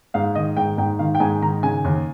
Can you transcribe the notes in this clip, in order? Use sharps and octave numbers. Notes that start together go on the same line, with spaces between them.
G#2 F5
D#3 D#5
G#2 G5
G#2 G5
D#3 F5
G5
G#2 G#5
D#3 A#5
C#3 G#5
D#2